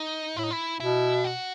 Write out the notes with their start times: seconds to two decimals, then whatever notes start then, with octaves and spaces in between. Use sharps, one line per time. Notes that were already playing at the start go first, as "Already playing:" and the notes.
Already playing: D#4
0.37 A2 E4
0.43 D#4
0.51 E4
0.80 B2 E4
1.24 F#4